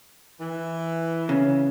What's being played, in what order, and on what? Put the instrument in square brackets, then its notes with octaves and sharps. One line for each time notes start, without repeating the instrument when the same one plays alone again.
[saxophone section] E3
[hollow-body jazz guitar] C#3